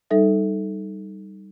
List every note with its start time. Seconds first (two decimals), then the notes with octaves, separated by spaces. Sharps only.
0.11 G3 D#4 A4 E5